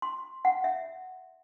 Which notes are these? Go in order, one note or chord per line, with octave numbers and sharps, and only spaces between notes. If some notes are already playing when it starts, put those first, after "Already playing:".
C6
F#5
E5